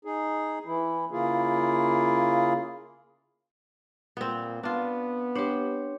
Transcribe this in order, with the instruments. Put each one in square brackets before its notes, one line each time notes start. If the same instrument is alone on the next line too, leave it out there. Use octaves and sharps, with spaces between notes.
[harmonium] D#4 G#4
E3 E4
C#3 A#3 E4 F4 G#4
[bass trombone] A#2 [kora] B3 C4
[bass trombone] B3 [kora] D4 F4
[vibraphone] D4 C#5 [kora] G4 C5